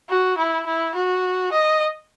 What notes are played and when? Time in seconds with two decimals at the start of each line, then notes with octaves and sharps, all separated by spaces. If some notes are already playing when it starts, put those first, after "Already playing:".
0.09 F#4
0.38 E4
0.66 E4
0.95 F#4
1.52 D#5